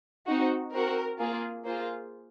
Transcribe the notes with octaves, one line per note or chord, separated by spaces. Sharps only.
C4 D#4 F#4
C4 F#4 A#4
A#3 F4 G#4
A#3 F4 G#4 C5